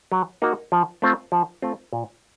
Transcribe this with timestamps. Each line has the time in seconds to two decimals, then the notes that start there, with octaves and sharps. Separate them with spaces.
0.12 F#3
0.42 A#3 D#4 F#4
0.72 F3
1.02 A3 C4 F4
1.32 F3
1.62 A3 C4 F4
1.93 A#2